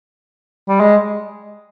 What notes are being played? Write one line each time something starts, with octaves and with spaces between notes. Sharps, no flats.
G3
G#3